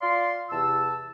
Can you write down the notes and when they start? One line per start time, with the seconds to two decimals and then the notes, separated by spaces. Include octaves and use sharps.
0.02 F4 D5 F5 C6
0.50 E2 C3 A5 E6